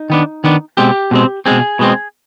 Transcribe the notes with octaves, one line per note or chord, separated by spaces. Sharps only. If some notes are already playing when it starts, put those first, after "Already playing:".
Already playing: D#4
D#3 B3 D4
D#3 B3 D4
B2 G#3 C4 G4
B2 G#3 C4
B2 G#3 C4 G#4
B2 G#3 C4